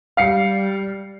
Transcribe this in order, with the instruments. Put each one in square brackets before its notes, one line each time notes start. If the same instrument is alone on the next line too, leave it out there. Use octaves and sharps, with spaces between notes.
[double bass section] G3 [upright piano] F5 C7 C#7